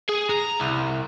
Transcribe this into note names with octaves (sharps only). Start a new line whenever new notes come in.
G#4
A#5
C2